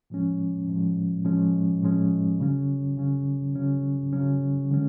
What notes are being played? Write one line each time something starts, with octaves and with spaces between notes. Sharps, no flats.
A2 F3 G#3 C#4
A2 F3 G#3 C#4
A2 F3 G#3 C#4
A2 F3 G#3 C#4
C#3 F#3 C#4
C#3 F#3 C#4
C#3 F#3 C#4
C#3 F#3 C#4
D3 G#3 C#4